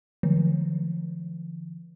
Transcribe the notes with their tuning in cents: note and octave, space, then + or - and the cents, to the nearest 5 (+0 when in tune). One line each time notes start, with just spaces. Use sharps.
D3 +20 F3 -40